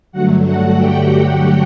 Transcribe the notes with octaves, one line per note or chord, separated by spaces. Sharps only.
G2 D3 F#3 A3 F#4 F#5
F#4 F#5
G4 G5